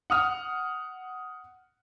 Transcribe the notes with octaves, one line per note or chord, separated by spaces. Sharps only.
F#5 D#6 F6